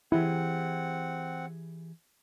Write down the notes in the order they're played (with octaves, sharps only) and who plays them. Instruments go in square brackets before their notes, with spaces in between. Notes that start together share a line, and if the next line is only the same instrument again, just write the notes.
[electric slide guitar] E3 G4 G#4 [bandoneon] C4 F#5 [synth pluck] E4